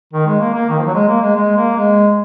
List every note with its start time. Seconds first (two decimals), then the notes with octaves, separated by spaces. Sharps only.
0.13 D#3
0.26 G#3
0.40 A#3
0.54 A#3
0.69 D#3
0.79 F3
0.86 F#3
0.95 G#3
1.08 A#3
1.22 G#3
1.35 G#3
1.57 A#3
1.77 G#3